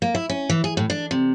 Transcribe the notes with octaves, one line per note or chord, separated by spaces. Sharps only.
A#3
E4
C#4
E3
G#4
A2
D4
C3